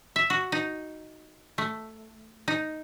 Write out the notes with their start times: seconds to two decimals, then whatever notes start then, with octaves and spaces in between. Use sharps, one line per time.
0.16 E5
0.30 F#4
0.52 D#4
1.58 A3
2.48 D#4